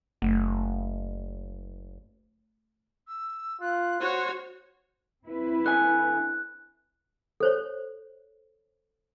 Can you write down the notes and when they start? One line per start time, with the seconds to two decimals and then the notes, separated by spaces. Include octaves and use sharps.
0.22 F#1 A3
3.08 E6
3.61 F4 F#6
4.01 F#4 C5 C#5
5.24 C4 E4 B4
5.66 D3 G#5 F#6
7.40 A4 C5 C#5